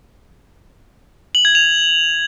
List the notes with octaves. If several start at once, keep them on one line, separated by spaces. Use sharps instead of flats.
F#7
G#6
F7